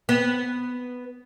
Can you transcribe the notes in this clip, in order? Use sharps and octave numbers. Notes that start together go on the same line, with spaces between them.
B3